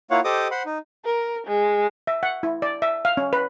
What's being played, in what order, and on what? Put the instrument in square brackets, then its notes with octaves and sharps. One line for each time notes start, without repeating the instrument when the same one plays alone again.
[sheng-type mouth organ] A#3 E4 F4 C#5 F5 F#5
G4 A4 C5 D#5 D6 D#6
C5 F#5 B5 C6
D#4
[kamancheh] A#4
G#3
[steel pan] E5
F#5
E4
D5
E5
F5
C#4
B4